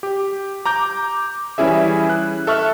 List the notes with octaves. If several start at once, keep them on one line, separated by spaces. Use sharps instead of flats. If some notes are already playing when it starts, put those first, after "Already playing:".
G4
A#5 D6 G6
E3 G3 C#4 E4 G#4 E5
F#6
A4 E5 C#6 F6 F#6